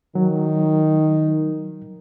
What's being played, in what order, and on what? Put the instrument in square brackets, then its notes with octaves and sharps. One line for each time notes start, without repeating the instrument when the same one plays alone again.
[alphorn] D#3 [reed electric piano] F#3